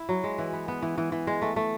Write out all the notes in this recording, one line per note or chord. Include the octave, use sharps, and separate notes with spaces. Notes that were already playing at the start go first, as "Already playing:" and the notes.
Already playing: E4
F#3
G#3
E3
B3
B3
E3
E3
E3
G#3
A3
A3